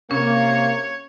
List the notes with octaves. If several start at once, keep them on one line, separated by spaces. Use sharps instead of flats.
C3 A#3 C#4 C#5